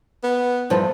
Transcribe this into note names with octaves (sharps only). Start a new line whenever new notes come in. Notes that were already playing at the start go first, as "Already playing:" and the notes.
B3
E2 G2 F3